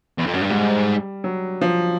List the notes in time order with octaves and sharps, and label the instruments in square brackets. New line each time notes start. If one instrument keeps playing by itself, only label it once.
[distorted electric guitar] E2
F2
F#2
G2
[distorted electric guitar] G#2 [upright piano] G3
[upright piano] F#3
F3